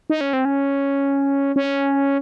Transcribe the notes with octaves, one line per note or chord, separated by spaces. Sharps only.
D#4
C#4
C4
C#4
C#4